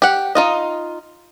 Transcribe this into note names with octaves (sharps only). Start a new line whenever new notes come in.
G4 F#5
D#4 F4 D#5